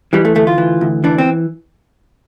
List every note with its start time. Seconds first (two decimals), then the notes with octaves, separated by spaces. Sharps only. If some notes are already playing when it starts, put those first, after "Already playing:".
0.13 E3 G3
0.25 A3
0.35 D2 A3
0.47 F4
0.58 E3
0.81 D2
1.04 E3 D4
1.18 C4